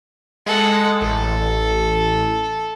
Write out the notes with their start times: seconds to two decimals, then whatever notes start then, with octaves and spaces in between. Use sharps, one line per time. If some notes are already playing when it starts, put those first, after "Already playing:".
0.46 G#3 A4 F#5
1.01 A1 A4